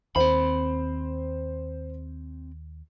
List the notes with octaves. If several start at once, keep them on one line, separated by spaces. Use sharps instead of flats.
D#2 C4 C5 B5